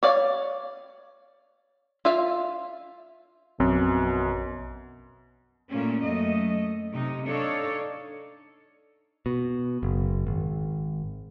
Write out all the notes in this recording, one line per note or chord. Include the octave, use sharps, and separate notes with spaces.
C#5 D5 F5
F4 E5 F5
A#1 F#2 B2 C4
A#2 A3 A#3 C#4
F#2 A3 D#5
C3 D#4
D4 D#4 A4 C#5 D5 F5
B2
F#1
G#1